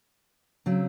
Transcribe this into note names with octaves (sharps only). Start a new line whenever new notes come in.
C#3 F#3 C4